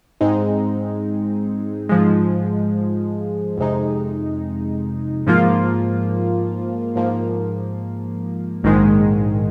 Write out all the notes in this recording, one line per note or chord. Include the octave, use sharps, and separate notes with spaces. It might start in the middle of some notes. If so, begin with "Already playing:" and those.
G#2 G#3 C4 D#4
G#2 F3 G#3
F2 C3 G#3 D#4
G#2 F3 A#3 F4
G#2 F3 A#3
A#1 G#2 D#3 G#3